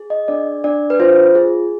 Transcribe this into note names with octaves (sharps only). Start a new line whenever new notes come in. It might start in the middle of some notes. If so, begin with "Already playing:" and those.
Already playing: G#4
D#5
D4 D5
D4 D5
B4
F4 C5
G#4